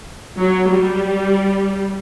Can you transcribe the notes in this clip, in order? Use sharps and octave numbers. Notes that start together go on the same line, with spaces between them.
F#3
G3